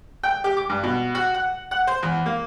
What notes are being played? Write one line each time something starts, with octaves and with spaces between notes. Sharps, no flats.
G5
G4
D6
G2
B2
F#4
F#5
F#5
C5
E2
A#3